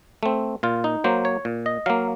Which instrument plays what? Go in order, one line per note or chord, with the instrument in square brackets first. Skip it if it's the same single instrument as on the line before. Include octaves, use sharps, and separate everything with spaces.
[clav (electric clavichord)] A3 C4
A#2 F4
D#4
F#3 A#3 C5
C#5
A#2
D#5
F#3 A#3 F5